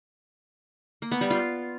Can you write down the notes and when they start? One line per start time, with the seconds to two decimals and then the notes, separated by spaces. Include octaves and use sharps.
1.02 A#3
1.12 B3
1.21 G3
1.30 F4